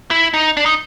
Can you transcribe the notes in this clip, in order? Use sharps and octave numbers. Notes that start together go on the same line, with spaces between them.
E4
D#4
D4
D#4